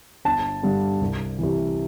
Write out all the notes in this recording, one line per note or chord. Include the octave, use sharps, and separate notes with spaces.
G1 A5
G2 D3 G3
C2
C3 E3